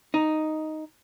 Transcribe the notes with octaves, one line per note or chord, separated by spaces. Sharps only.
D#4